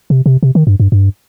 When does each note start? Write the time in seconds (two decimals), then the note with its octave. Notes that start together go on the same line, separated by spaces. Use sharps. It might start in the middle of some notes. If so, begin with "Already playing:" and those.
0.10 C3
0.26 C3
0.43 C3
0.55 D#3
0.67 G2
0.80 G2
0.92 G2